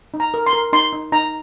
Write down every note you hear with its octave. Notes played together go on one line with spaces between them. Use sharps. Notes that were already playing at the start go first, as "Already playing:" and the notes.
D#4
A#5
A#4
C6
A#4
D#4 C6
D#4
D#4 A#5